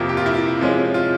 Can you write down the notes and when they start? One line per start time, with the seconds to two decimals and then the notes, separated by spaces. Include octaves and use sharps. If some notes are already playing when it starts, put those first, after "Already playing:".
Already playing: F2 C3 F3 A#3
0.09 G4
0.17 F4
0.26 E4
0.34 F4
0.59 C3 F3 G#3 C#4
0.94 F4